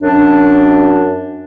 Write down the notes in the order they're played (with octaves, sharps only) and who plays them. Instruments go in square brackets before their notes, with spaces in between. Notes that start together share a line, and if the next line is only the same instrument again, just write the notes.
[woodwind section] F#2 D4